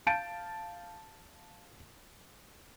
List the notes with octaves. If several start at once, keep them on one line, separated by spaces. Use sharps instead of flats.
F5 A5 G6 A6 D7